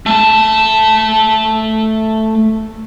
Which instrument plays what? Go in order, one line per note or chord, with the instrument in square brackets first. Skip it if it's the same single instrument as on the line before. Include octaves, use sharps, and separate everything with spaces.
[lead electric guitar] A3 A5